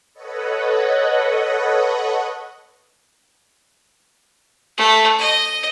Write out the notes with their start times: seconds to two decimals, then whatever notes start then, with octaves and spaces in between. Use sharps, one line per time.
0.13 A4 B4 C#5 D#5 F#5
4.78 A3
5.19 D#5